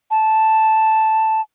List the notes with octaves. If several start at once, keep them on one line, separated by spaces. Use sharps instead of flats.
A5